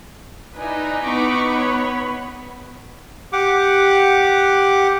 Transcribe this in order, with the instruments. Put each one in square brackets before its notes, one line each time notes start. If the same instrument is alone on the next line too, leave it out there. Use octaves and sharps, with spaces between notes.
[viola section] D#4 [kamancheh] E4 G#5 [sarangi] B4 [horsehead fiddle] D5
[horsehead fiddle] B3 B5 [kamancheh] C#6 D6
[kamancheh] C#5
[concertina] G4 F#5 D6